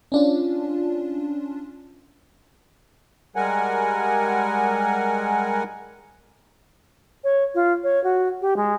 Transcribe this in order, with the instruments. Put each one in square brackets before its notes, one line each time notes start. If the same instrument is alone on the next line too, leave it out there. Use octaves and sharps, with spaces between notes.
[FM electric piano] C#4 D4 F4
[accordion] G3 G#3 A#4 F#5 G#5
[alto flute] C#5
F4
C#5
F#4
G4
G#3